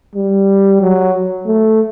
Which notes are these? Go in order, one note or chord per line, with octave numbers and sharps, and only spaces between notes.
G3
F#3
A3